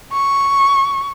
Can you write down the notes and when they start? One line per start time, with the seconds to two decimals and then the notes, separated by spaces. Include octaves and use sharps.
0.13 C#6